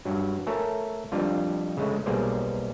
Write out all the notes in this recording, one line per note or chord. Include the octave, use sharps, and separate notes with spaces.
G2 F#3
A3 A4 A#4 C#5 G#5
F2 G3 D4 F4
C#3 G#3 A3
B1 G3 A#3 G#4 C5 D5